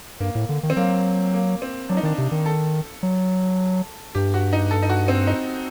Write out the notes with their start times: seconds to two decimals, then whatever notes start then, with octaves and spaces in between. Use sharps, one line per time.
0.20 G2 A#3
0.35 A2
0.49 D3
0.63 D#3
0.70 C4
0.76 F#3 A#3
1.34 A#3
1.62 C4
1.89 F#3 D4
1.97 D#4
2.03 D#3 D4
2.18 C3
2.32 D#3
2.46 A4
3.03 F#3
4.15 G2 G4
4.34 F#4
4.53 D#4
4.71 A4
4.83 D#4
4.90 F#4
5.08 C4
5.27 D#4